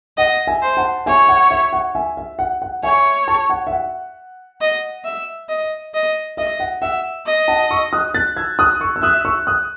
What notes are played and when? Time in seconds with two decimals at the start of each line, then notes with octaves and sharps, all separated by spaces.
0.17 D#5 F#5
0.47 E5 G#5
0.62 C5
0.77 F#5 A5
1.06 C#5 E5 G#5
1.29 F#5
1.51 E5
1.73 F#5
1.95 E5 G#5
2.17 E5
2.39 F#5
2.62 F#5
2.83 C#5 E5 G#5
3.28 A5 C#6
3.50 F#5
3.67 E5
3.72 F#5
4.61 D#5
5.04 E5
5.49 D#5
5.94 D#5
6.37 D#5 E5
6.60 F#5
6.82 E5 F#5
7.26 D#5
7.48 F#5 A5
7.70 C#6 E6
7.93 D#6 F#6
8.14 F#6 A6
8.37 E6 G#6
8.59 D#6 F#6
8.81 C#6 E6
8.96 E6
9.02 E5 D#6 F#6
9.25 C#6 E6
9.47 D#6 F#6